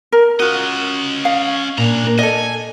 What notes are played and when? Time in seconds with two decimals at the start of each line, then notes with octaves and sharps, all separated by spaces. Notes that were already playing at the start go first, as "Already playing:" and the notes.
0.12 A#4
0.40 C#4 F4 F#4 D#5
1.25 F5
1.78 A#2 D4 A#5
2.04 A#3 A#4
2.18 A4 D5 D#5 G#5